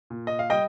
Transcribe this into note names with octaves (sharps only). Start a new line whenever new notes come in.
A#2
D#5
F5
G3 D#5 G5